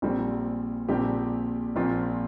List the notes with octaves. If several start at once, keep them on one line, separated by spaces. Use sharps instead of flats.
A#1 A#2 G3 C4
A#1 A#2 G3 C4 G4
A#1 A#2 F3 C4 F4